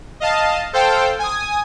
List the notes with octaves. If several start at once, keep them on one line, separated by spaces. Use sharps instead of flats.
D#5 F5 A5
A4 C5 F5 G5
G#5 D#6